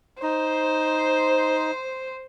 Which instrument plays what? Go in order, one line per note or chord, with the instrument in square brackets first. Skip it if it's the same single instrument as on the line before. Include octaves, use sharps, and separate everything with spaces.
[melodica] D#4 [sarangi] C5